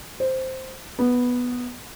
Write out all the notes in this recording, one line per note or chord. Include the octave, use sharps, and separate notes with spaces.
C5
B3